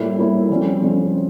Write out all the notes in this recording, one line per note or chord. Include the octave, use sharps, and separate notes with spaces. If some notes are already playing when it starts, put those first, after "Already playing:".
Already playing: A2 G3 A#3 E4
A2 G3 A#3 E4
F2 C#3 G3 C#4
F2 C#3 G3 C#4